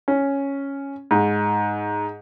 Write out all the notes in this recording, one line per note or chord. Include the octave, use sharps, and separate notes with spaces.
C#4
G#2